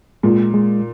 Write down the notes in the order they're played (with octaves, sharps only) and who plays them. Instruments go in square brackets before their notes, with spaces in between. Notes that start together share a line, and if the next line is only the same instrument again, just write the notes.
[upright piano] A#2 [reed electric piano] G#3
[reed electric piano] G#3